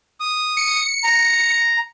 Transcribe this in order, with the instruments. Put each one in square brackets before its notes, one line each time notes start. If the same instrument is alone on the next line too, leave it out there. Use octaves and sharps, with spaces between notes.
[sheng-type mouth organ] D#6
[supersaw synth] C#7
[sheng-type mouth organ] A#5